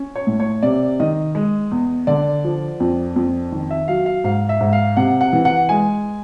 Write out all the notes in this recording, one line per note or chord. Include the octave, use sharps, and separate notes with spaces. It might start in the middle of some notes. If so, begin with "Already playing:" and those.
Already playing: C#4
C#5
A2
C#5
C3 D5
D#3 D#5
G#3
E2
D3 D5
F3
F2
F2
D#3
E5
F#3 F5
F5
G#2 F5
E5
G#2
F5
C3 F#5
F#5
E3
F#5
G#3 G#5